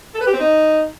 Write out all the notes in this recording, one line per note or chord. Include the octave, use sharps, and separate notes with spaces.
A4
B4
G4
C4
D#4